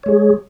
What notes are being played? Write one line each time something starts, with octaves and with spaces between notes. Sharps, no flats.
G#3 G#4 C#5